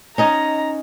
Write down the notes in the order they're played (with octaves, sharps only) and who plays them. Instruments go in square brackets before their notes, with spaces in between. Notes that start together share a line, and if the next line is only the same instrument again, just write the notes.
[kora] C#4 D#4 C#5 [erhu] A#5